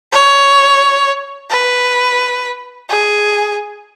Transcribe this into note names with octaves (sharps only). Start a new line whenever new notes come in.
C#5
B4
G#4